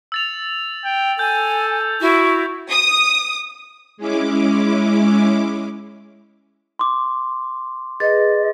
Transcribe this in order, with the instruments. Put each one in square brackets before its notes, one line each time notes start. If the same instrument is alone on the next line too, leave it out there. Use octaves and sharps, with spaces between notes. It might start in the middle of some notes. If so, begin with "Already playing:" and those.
[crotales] E6 A6 F7
[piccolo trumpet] G5
[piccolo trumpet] A4 [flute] G#5 [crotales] G6
[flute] E4 [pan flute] F#4
[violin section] D#6
[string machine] G#3 C#4 E4 D6
[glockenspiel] C6 D6
[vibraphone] G#4 B4 [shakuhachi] D#5 [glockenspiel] A6